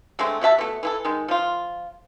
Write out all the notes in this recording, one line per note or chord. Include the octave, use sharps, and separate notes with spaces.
D3 G#3 A3 C4
C3 F#4 E5 A5
B2 A3
E3 E4 A4
D#3 G#3
F3 F4